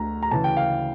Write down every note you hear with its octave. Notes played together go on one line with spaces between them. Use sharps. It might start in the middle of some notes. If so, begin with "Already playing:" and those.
Already playing: D2 D3 A#5
A#5
D2 C#3 E3 A5
G5
F5